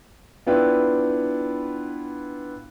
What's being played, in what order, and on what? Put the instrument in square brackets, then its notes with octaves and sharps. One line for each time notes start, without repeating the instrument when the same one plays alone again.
[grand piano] B3 D4 E4 F4 B4 G5